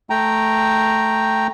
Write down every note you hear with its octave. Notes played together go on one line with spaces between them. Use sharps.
A3 G5 A#5